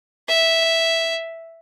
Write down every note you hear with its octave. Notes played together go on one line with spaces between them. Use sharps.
E5